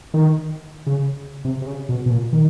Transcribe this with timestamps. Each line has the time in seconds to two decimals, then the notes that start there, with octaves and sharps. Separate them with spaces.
0.14 D#3
0.87 C#3
1.45 C3
1.62 C3
1.66 C#3
1.89 B2
2.06 B2
2.11 A#2
2.33 D#3